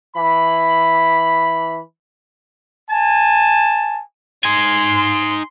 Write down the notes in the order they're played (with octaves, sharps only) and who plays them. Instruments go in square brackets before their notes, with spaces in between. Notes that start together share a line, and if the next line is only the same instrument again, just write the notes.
[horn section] E3 B5
[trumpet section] G#5 A5
[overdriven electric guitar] D#4 G#5 [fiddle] C6